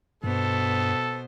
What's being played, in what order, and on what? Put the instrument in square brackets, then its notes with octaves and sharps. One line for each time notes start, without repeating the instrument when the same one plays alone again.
[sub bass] G2 [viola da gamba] B2 B3 C5 [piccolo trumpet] A4